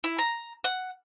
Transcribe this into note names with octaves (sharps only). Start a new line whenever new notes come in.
E4
A#5
F#5